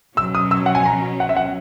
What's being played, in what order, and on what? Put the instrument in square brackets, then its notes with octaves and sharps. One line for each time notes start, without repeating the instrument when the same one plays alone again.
[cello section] B2 F#3 C#4 [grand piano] E6
[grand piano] D#6
E6
F#5
G#5
A#5
F#5
E5
F#5